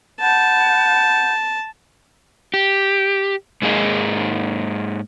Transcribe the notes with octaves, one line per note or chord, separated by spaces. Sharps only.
F#5 A5 B5 G6
G4
G#2 A#3 G#4 D#5